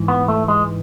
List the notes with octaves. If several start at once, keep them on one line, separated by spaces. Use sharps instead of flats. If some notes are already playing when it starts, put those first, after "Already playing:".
Already playing: G#2 E3
B3
A3
G#3